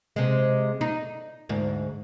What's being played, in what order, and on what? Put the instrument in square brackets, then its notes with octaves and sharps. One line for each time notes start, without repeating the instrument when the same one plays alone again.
[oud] C3 G#3
D#4
D2 G#2